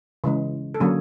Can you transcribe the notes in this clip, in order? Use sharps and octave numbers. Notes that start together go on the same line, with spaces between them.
C#3 E3 G#3
A4
D3 F#3 A#3 C#4 G#4